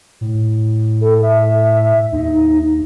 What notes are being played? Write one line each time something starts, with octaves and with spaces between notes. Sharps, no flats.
A2
A4
E5
D#2 D#4